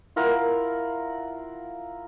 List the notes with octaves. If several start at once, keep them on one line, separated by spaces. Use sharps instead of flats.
E4 F4 A#4 F#5